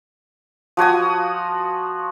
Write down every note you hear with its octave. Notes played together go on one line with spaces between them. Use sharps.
F3 F#4 G#5 D#6